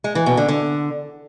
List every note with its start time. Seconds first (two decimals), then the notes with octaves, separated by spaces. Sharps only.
0.04 G#3
0.15 E3
0.26 B2
0.37 D3
0.48 D3